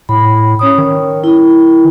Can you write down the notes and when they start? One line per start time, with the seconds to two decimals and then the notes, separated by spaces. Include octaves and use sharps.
0.09 A2 B5
0.59 C#4 C#5 D#6
0.78 D#3 C#5
1.24 E4